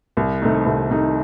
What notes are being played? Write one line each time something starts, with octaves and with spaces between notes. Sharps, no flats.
C2
C3 D#3 A3 D#4
C2
C3 D#3 A3 D#4